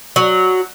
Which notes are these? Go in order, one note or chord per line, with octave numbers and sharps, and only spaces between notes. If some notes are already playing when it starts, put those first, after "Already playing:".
F#3